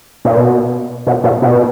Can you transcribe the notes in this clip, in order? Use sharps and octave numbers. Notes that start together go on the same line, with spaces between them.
A#2
B2
B2
A#2
B2